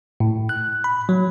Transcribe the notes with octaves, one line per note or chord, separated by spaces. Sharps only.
A2
F#6
B5
F#3